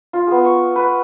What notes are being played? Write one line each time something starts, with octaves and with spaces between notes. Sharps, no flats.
F4
B3 G#4
C#6
B4